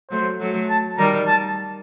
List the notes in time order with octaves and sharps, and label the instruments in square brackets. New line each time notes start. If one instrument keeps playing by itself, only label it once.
[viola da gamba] F#3 A3 [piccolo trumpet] C5
[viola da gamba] F#3 A3
[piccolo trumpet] A5
[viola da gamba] D#3 G3 [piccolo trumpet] A#5
[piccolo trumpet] A5